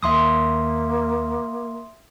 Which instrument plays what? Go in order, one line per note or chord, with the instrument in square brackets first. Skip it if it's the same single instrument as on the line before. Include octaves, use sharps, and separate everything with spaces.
[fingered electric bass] D#2 D#3 [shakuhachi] A#3 [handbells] E5 C6 D#6